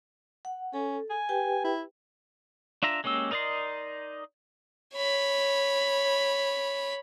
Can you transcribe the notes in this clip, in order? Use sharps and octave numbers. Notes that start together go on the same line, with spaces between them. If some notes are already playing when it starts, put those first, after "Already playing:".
F#5
C#4 A4
G#5
G4 B4 G5
E4
D4 F4 E5 A#5
G#3 A#3 C#4 G4 E6
D#4 A#4 D5 D#5 C6
C#5 B5